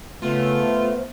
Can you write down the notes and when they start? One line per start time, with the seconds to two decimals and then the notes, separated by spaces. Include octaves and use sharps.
0.22 C#3 A3 B3 F4
0.64 C5